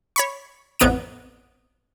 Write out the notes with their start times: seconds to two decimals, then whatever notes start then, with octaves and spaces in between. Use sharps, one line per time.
0.16 C#5 B5 C#6
0.79 A1 F2 B3 A#5 D7 D#7